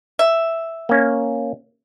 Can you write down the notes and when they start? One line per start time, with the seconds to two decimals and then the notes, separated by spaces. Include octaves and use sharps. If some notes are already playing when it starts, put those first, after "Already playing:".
0.19 E5
0.89 A#3 C#4